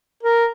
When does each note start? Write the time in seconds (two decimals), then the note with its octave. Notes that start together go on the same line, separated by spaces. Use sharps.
0.23 A#4